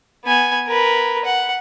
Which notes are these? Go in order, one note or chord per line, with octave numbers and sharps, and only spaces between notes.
B3 G#5
A#4 B4
F#5